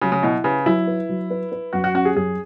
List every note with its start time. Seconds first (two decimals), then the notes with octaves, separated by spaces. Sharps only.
0.02 C#3 F#3
0.12 C#3
0.23 B2 E4
0.44 C#3 B4
0.66 F#3 E4
0.87 B4
1.09 F#3
1.30 B4
1.52 B4
1.73 F#2 F#4
1.84 F#4
1.94 C#4 F#4
2.05 G#4
2.16 F#2 G#4